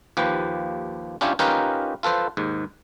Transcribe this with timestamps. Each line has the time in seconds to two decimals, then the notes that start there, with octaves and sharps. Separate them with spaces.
0.17 D#2 F3 G4 B4
1.21 C#4 D4 E4 F4 G4 C#5
1.39 C#4 D#4 F4 G4 A#4 B4
2.03 F4 A4 B4 C5
2.37 D#2 G#2